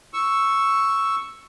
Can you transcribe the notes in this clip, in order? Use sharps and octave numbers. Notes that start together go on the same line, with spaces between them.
C#6 E6